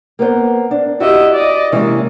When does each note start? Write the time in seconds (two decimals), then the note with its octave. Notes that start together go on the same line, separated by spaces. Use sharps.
0.19 A#3 B3 C5
0.71 D4
1.00 E4 F#4 G4 D#5 E5
1.34 D5 D#5
1.72 C3 E3 G#3 A#3 C#4